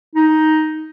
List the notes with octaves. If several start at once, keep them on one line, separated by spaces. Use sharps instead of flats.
D#4